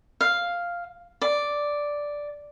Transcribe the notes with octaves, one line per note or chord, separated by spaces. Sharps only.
F5
D5